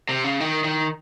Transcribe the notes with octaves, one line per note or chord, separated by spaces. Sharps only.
C3
C#3
D#3
D#3